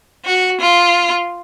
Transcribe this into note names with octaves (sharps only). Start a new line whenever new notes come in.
F#4
F4